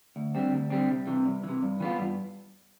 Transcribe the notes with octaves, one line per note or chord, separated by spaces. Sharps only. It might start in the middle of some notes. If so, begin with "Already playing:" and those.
D2
D3 G3 C4
D2
D3 G3 C4
C2
C3 E3
C2
C3 E3
G2
E3 B3 F4
G2